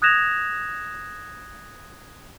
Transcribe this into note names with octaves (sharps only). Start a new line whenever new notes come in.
D#6 F#6 G#6 A#6 E7 F7